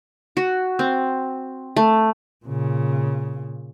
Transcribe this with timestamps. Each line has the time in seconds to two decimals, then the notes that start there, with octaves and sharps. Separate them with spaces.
0.37 F#4
0.79 C4
1.76 A3
2.46 A#2 C#3